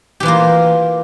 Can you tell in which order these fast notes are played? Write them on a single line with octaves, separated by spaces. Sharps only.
G4 E3 F4 A#3